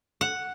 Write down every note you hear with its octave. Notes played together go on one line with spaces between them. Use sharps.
F#5